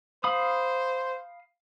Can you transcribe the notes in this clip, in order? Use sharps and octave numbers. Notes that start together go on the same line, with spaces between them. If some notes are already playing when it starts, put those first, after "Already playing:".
C5 F5 B5 D#6